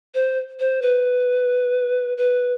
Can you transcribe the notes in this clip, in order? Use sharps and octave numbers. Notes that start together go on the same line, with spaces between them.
C5
C5
B4
B4